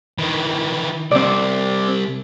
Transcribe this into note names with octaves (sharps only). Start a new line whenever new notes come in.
D#3 E3
C2 C4 D5